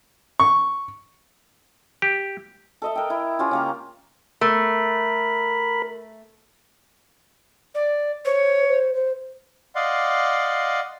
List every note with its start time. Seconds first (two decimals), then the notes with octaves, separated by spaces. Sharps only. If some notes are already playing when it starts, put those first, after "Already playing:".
0.40 C#6
2.02 G4
2.82 A4 D#5 E5
2.95 A#4 G5
3.10 E4
3.39 C#4 F4 G4
3.51 C#3 A#3 A#5
4.41 A3 A#4 B5
7.75 D5
8.25 C5 C#5
8.67 C5
8.93 C5
9.75 D5 D#5 F5 F#5 C6